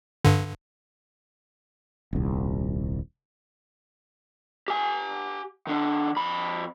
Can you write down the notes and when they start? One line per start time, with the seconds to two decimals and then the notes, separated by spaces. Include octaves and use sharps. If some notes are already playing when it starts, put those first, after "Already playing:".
0.25 G2 D3
2.13 D#1 C2
4.68 G4 G#5
5.67 D#3 D4
6.17 F2 B5